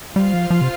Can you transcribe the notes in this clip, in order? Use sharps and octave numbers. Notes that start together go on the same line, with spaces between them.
G3 F4 C5 F5
F3
F3
C3